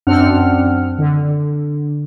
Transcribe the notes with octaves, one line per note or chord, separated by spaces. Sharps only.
F#2 C4 D4 F#5 F6
D3